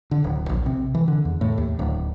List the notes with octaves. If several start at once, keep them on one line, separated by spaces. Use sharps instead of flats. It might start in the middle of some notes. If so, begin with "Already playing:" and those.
D3
D1
A#1
C3
E3
D3
E2
A2
D#2
D1